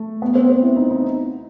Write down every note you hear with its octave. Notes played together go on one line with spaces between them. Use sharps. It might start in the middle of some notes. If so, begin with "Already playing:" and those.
Already playing: A3
B3
C4
C4
E4
D#4
D#4